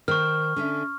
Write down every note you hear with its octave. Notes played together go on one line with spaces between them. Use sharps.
D#3 A#4 C5 C#6 F6
D3 C#4 E5